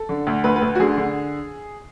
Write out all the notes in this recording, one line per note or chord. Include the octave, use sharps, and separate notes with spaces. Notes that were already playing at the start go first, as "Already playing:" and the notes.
Already playing: A4
D3
D2
D2 B4
B4
D2
F#4
D3 G#4
D3